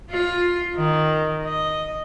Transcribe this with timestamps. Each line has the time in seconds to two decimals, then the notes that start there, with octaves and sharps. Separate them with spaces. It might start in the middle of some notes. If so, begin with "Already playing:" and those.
0.11 F4
0.75 D#3
1.44 D#5